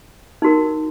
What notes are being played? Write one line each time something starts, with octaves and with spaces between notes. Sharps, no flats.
D#4 F#4 A#4